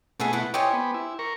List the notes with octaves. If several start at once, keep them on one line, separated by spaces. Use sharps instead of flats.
B2 A3 G#4 E5 F#5
E4 F#5
E4 G4 C5 C#5 D#5 G#5
B3
E4
A#4 C#6